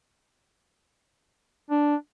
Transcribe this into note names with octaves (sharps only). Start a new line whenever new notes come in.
D4